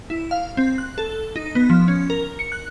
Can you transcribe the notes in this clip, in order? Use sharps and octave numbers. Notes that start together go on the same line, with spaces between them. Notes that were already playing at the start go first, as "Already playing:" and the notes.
E4
F5
C4
F#6
A4
D#4
B3
F3
C#4
A#4
C#7
F#6